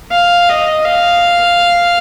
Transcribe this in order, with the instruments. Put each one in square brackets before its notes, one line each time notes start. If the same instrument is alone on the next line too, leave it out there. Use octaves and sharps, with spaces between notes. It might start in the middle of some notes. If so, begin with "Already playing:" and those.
[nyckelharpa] F5
D#5
F5